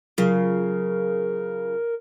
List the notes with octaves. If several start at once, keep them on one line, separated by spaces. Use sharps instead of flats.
C#3 F#3 F4 A#4